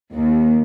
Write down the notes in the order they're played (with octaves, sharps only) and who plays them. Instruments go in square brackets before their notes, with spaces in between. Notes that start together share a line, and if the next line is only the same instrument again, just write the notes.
[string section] D#2